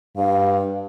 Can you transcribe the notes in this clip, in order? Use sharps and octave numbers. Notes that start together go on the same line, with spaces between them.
G2 F5